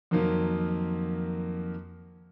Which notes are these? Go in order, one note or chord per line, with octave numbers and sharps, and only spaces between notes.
F2 D#3 F3 F#3 A#3